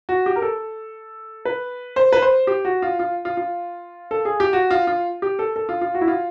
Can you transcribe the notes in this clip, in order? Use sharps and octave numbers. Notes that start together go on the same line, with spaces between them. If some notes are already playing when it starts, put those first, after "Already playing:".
F#4
G4
A#4
A4
B4
C5
B4
C5
G4
F#4
F4
F4
F4
F4
A4
G#4
G4
F#4
F4
F4
G4
A4
A4
F4
F4
F#4
E4
F4